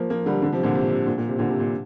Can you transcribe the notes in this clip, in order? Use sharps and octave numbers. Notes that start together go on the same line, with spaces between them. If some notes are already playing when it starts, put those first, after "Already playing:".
Already playing: F3 A#3
F3 A#3
D3 G3
D3 G3
C3 F3
A#2 D3
C3
C3
A#2
A#2
C3
A#2 D3
C3
A#2